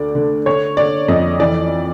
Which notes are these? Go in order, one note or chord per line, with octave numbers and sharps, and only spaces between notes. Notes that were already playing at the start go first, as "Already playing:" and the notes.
Already playing: D2 D3 D5
D3
D3 C#5
D3 D5
F2 D#5
E3 D5